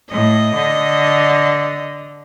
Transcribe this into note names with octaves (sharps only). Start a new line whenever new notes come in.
A2 D#5
D3